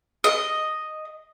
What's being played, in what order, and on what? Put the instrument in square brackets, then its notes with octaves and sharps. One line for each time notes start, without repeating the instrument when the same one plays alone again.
[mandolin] D#5